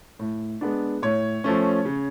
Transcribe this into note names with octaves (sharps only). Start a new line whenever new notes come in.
A2
G#3 B3 D4
A2 C#5
F3 A3 C#4
C#3